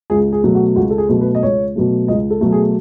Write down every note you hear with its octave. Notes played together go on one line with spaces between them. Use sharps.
C#2 G#4
G#4
B2 F#3 A3
F#4
C#2 F#4
A4
G#4
B2 F#3 A3
B4
D#5
C#2 C#5
B2 F#3 A3
C#2 D#5
A4
B2 F#3 A3
G#4